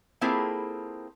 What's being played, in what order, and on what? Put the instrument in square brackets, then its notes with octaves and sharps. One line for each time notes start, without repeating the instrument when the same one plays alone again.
[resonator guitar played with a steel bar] A#3 C4 E4 F4 G#4 A4